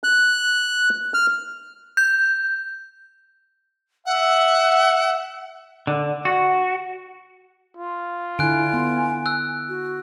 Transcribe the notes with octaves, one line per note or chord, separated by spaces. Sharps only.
F#6
F6
G6
E5 F#5
D3
F#4
F4
D3 E4 G#5 F#6 D7
B3
E6 F#6
F#4